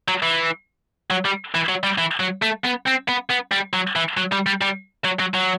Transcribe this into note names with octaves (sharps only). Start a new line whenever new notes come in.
F#3
E3
F#3
G3
E3
F#3
G3
E3
F#3
A3
B3
C4
B3
B3
G3
F#3
E3
F#3
G3
G3
G3
F#3
F#3
F#3